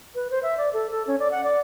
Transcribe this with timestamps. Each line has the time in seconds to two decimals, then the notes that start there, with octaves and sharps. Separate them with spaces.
0.15 B4
0.31 C5
0.43 E5
0.58 D5
0.73 A4
0.91 A4
1.07 C#4
1.19 D5
1.31 F#5
1.44 D5